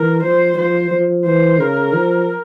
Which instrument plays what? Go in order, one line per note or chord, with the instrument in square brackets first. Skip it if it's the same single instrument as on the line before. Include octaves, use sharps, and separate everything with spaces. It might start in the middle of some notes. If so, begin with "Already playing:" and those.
Already playing: [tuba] E3 [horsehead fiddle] A#4
[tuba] F3 [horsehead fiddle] C5
[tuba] F3 [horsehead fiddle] C5
[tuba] F3
[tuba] E3 [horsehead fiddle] C5
[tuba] C#3 [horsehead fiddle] A#4
[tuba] F3